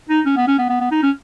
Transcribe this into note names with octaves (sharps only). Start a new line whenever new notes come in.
D#4
C#4
B3
C#4
B3
B3
B3
D#4
C#4